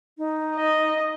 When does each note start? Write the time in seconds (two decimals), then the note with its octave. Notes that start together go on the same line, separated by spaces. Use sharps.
0.18 D#4
0.55 D#5